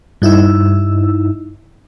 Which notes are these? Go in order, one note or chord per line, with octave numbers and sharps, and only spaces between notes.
G2 D#4 E4 E6